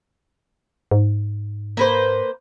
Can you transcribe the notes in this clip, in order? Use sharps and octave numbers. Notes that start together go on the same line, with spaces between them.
G#2
A#3 B4 C5